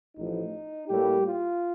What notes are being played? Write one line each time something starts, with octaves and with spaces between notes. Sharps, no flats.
A1 A2 F3 D#4
A2 G3 A#3 G4
F4